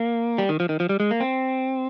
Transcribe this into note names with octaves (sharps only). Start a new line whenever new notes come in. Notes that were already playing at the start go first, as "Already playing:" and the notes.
Already playing: A#3
G3
D#3
F3
D#3
F3
G3
G#3
A#3
C4